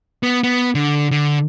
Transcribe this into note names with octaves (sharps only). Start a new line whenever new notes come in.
B3
B3
D3
D3